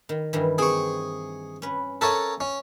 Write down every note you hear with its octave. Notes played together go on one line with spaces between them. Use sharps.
D#3
G2 D#3 E3
C4 G#4 C#6
C#4 B4
A4 A#4 C#5 E5 F#5 G#5
C#4